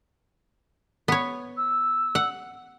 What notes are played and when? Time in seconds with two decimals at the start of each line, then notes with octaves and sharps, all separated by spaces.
1.08 B3 C#5
1.57 E6
2.15 F#5